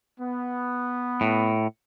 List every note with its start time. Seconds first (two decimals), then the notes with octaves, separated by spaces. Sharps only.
0.19 B3
1.21 A2